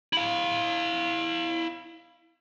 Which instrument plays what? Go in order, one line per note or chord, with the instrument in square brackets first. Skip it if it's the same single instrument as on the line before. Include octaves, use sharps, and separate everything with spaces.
[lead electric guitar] E4 F5